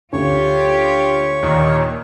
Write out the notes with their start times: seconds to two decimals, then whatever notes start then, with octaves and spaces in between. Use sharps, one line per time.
0.13 D2 F4 G4 C#5
1.43 D#2 A#2 D#3